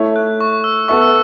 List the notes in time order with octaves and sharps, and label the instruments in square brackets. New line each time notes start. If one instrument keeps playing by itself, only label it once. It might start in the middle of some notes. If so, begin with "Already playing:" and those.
Already playing: [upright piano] A3 E4 C#5
[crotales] F#6
C#6
E6
[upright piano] B3 A4 E5 [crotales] C#6
[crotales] E6